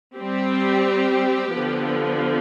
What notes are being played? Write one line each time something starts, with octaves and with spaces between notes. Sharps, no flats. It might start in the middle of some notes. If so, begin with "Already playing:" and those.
G3 C4 G4
D3 F3 B3